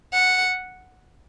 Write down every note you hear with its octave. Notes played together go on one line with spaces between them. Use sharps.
F#5